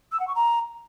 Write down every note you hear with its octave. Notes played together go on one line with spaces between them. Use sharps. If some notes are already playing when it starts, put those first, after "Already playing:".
E6
F#5
C#6
A#5